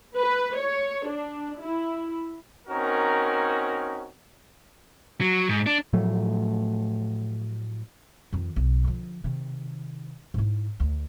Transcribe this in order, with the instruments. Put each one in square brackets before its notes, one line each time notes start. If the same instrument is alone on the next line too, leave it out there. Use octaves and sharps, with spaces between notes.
[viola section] B4
C#5
D4
E4
[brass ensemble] C4 C#4 D#4 F#4 A#4
[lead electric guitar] F#3
G#2
D4
[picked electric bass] A2 F3 F#3 A3
[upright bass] F2 D#3
B1
D3 F3
C3 D#3
G#2 E4
D2